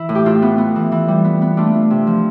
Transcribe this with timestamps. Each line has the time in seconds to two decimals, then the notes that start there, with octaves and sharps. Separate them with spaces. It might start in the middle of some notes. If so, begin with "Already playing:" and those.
Already playing: E3 E4
0.09 A2
0.15 G4
0.25 A2 F4 A4
0.42 B3
0.58 B3
0.76 E3
0.92 E3
1.08 G3
1.24 B3
1.42 B3
1.57 A3 D4 F4
1.75 A3
1.90 C3
2.07 F3